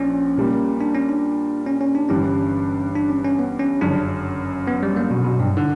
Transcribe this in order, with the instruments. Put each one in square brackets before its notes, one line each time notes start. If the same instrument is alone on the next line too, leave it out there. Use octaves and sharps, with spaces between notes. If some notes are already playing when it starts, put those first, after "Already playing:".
Already playing: [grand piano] A#1 A#2 [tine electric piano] C#4
[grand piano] A#2 G3 A#3
[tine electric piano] D4
C#4
D4
C#4
C#4
D4
[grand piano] G1 G2 E3 G3 [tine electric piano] C#4
[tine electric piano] D4
C#4
C#4
B3
C#4
[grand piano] G1 F#2 C#3 [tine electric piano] D4
[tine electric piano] B3
G3
A#3
B2
B2
G2
[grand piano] D3